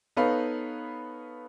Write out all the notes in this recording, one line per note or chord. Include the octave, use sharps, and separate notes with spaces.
B3 D#4 A4 B4 C#5 F5